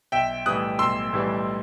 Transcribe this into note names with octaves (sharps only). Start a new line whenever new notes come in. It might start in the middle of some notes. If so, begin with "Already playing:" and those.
B1 E5 G5
A2 E3 G3 D#6 F#6
B1 C6 E6
A2 E3 G3